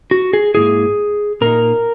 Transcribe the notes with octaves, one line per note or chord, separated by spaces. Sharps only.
F#4
G#4
G#2 D#3 A#3 E4 G#4
A#2 A#3 D#4 A#4